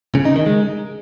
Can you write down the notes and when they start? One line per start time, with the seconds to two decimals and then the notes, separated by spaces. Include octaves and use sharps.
0.15 C#3
0.25 D#4
0.36 D#3
0.46 G#3